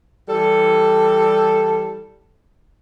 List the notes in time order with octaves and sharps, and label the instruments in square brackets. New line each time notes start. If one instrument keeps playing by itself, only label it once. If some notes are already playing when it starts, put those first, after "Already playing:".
[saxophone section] E3 G3 A4